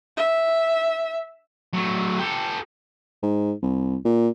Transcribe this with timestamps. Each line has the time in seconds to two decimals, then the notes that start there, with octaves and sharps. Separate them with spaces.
0.17 E5
1.74 F#3 A3
2.19 G4 A4
3.23 G#2
3.62 C2
4.05 A#2